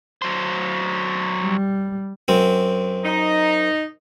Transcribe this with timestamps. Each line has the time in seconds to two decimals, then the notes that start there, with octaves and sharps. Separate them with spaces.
0.22 F#3 C5
1.43 G3
2.28 F#2 C4
3.05 D#4